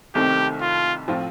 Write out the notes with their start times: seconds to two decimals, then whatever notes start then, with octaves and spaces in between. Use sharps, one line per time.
0.15 C2 C3 D#3 A3 C4 G4
0.61 F4
1.08 A2 F3 C4 F4